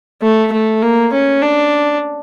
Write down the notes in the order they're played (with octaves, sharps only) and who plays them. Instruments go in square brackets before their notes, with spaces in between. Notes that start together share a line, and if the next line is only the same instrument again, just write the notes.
[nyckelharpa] A3
A3
A#3
C#4
D4